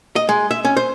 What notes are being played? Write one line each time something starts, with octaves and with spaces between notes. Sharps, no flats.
D#5
G#3
E5
C#4
C5